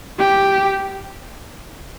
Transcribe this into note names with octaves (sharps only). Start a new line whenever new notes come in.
G4